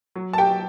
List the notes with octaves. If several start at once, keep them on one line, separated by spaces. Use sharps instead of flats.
F#3
A5
G4 G5
F#3